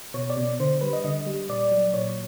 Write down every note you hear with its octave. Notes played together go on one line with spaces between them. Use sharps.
B2 C#5
D5
B2
D3 C5
G3 B4
D#5
D3 D#5
G3
A#2 D5
F#3
A#2 C#5